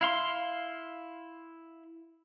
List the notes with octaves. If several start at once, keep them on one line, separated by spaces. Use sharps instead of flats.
E4 F5 C6